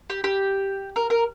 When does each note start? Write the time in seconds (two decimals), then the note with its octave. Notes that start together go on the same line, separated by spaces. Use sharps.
0.10 G4
0.24 G4
0.96 A#4
1.10 A#4